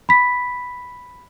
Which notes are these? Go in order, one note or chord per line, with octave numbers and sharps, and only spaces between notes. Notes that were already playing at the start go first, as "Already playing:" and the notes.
B5 B6